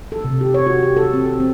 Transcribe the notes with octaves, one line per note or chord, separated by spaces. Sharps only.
A4
C3
G4
C#5
F#4
G4
A4
C4
A4
C4